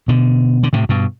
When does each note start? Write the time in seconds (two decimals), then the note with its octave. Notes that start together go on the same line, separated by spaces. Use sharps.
0.08 B2 D3
0.63 D3
0.73 A2 C3
0.89 G2 B2